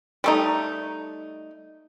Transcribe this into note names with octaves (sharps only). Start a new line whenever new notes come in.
G3 A3 D#4